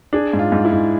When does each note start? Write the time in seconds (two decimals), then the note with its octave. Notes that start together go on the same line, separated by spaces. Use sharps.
0.13 D4 G#4
0.33 G#2
0.39 F4
0.52 G#2
0.65 E4
0.72 G#2